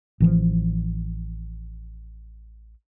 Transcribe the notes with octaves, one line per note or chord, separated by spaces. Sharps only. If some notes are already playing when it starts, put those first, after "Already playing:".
A1 E3 F3